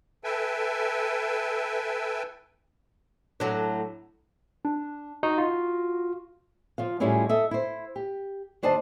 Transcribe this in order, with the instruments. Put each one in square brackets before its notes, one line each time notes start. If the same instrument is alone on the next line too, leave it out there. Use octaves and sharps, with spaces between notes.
[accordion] A4 B4 E5 G5 G#5
[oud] A2 F#3 D4
[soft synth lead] D4
[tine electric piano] D#4 [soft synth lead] F#4
[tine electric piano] F4
[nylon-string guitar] F3 F4 F5
A2 G3 G#3 C#4 E4 F4
A4 D#5 E5
E4 C5
G4
D#2 D4 C5 D#5 A5